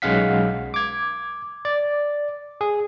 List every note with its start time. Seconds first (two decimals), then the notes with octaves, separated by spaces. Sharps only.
0.02 B1 G#3 C#4 F5 F#5 B6
0.74 D6 G#6
1.65 D5
2.61 G#4